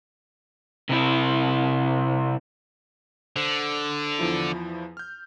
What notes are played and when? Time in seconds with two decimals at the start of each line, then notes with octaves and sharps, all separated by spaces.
0.90 C3 E4
3.36 D3 C5
4.19 E2 F3 E4
4.97 F6 G6